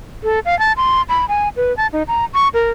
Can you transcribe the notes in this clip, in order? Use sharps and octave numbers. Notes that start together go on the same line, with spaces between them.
A4
F5
A5
C6
B5
G#5
B4
A5
D#4
A#5
C#6
A#4